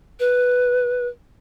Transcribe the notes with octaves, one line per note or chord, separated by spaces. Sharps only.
B4